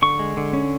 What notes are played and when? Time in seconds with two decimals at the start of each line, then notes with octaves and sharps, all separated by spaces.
0.02 D3 C#6
0.19 G#3
0.37 D3
0.53 C#4